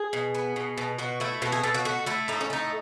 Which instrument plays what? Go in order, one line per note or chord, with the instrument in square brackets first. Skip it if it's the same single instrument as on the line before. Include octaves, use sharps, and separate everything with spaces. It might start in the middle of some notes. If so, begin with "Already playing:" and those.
Already playing: [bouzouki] G#4
B2
B3
B2
B2
B2 F#4
A3 E4
B2 F#4
G#4
B2 A4
F#4
A3 F#4
A3 E4
A2 D#4
C#4
A3 D#4